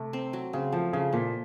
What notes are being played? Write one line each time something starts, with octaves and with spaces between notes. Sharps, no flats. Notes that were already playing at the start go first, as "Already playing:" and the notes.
Already playing: C3 A3
C4
F#3
C#3 C4
F3 A3
C#3 F3
A#2 F3